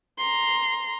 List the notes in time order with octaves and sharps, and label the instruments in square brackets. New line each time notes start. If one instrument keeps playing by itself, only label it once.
[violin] A#5 C6